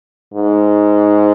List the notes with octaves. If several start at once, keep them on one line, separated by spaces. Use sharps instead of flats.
G#2